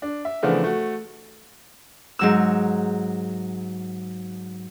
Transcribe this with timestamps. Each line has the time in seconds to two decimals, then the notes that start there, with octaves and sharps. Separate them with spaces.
0.02 D4
0.25 E5
0.43 C#3 E3 F3 A3 B3 D4
0.64 A3 F#4
2.19 G#2 F#3 E6